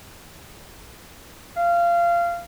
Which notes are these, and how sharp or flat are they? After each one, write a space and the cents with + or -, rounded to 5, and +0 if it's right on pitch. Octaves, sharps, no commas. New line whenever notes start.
F5 -20